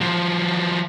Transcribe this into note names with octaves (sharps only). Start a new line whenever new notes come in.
F3 F#3